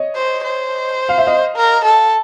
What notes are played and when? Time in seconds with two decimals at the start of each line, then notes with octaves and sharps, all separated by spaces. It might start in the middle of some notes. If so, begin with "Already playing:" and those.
Already playing: C#5 D#5
0.16 C5
0.44 C5
1.09 F5
1.18 E5
1.26 D#5 F5
1.56 A#4
1.85 A4